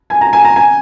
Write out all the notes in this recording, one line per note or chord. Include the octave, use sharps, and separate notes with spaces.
G#5
A#5
G#5
A#5
G#5